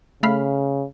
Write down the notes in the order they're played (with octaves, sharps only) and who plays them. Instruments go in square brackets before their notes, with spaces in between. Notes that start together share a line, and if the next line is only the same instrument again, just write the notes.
[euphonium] C#3 [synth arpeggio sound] A3 F5 B5